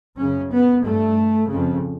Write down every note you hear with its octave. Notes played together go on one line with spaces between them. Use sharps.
F#2 C#3 C#4
B3
G2 A3
F2 C#3